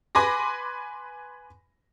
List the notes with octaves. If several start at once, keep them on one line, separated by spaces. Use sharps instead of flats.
B4 G#5 B5 C6 D6 A#6